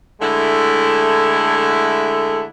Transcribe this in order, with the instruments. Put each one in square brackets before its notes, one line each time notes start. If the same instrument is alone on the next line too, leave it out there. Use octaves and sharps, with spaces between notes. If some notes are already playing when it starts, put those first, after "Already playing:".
[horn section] D3 G#3 A3 E4